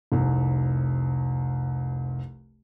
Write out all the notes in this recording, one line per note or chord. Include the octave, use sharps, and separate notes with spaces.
F1 C2